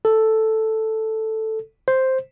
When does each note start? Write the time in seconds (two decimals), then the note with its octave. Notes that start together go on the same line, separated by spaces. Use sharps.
0.05 A4
1.88 C5